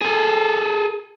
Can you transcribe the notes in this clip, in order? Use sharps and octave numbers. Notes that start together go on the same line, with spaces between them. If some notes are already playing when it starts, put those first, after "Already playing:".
G#4 A4